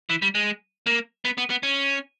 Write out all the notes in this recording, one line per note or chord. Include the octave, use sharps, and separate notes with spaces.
E3
G3
G#3
A#3
B3
B3
B3
C#4